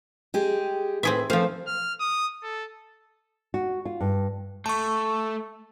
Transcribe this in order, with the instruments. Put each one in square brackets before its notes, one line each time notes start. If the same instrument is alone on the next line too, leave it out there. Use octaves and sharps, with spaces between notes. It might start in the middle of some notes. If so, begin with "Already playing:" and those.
[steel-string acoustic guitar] G#3 G4 G#4
[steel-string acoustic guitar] A2 B4 [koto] C4 G#4 E5
[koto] F3 F5 [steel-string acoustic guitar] A3 C4
[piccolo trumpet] F6
D#6
A4
[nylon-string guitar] F#4
F4
G2
[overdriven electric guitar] A3 [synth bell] A5 C#6